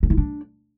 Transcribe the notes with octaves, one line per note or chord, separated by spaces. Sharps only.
C#4
E4
D4